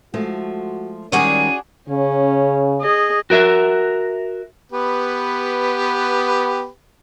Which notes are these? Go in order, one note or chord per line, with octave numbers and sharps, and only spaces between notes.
F3 G#3 A3 F#4
D#3 G3 G#3 C#4 D4 F#4 G#4 D#7
C#3 C#4
G#4 D#5
F#4 A#4 E5
B3 G4 B4